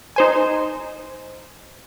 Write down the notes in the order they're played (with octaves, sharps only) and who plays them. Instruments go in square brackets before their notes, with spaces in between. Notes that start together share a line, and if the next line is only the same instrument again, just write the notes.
[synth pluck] D#4 C5 G#5